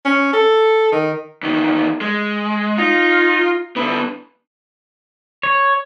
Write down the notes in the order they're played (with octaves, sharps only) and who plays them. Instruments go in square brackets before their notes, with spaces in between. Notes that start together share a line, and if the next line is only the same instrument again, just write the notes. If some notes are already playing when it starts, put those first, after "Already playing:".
[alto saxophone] C#4
A4
D#3
[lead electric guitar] E2 D#3
G#3
[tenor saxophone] D#4 [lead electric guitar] F4
[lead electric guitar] D3 B3 [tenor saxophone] E4
[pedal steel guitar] C#5